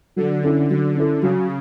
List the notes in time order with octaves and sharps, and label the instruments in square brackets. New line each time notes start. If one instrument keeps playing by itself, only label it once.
[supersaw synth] D3 [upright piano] F#3
[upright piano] C#4 E4 A4
[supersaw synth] D3 [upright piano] F#3
[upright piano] C#4 E4 A4
[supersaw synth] C#3 [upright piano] F#3